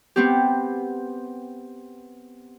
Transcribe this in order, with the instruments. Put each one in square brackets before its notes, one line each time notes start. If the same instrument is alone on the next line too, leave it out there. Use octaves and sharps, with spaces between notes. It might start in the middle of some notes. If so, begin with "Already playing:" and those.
[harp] B3 C4 G4